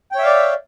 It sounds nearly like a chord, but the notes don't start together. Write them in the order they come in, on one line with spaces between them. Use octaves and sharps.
G5 C#5 E5 F5 D5